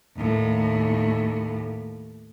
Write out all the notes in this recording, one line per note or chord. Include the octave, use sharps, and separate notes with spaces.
D#2 A2